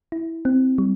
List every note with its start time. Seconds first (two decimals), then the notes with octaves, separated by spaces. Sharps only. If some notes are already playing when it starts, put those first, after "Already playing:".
0.12 E4
0.45 C4
0.78 G3